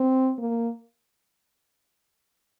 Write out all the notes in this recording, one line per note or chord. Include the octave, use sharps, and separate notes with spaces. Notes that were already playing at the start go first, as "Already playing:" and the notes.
Already playing: C4
A#3